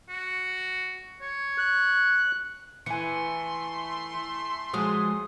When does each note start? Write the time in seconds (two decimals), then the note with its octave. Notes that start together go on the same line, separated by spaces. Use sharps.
0.09 F#4
1.21 C#5
1.58 F#6
2.86 E3 A3 G#5 C6 C#7
4.73 F3 F#3 G#3 G#4 D#6